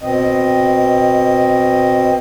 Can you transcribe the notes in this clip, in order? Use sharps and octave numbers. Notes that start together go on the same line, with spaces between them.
B2 C4 D#5